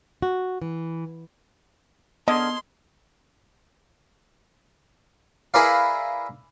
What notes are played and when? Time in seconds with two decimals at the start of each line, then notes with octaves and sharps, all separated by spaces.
0.22 F#4
0.62 E3
2.28 D3 B3 D#5 C6 F6 G#6
5.54 E4 G#4 A#4 B4 D5 F5